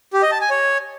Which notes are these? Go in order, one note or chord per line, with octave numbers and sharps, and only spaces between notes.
G4
D#5
A5
G#5
C#5